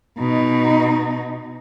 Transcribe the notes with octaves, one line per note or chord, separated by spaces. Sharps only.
B2 D#4